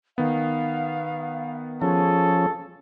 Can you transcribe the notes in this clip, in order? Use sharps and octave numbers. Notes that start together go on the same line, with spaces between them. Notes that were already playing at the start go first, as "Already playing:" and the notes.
D#3 B3 F5
F3 C#4 G#4 A4